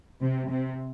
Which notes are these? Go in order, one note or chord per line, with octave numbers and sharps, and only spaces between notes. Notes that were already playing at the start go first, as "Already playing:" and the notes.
C3
C3